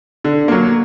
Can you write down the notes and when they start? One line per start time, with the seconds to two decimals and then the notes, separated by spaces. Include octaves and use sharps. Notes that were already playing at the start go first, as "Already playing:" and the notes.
0.24 D3
0.48 F#3 A#3